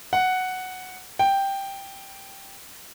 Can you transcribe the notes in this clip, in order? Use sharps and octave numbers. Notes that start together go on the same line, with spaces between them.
F#5
G5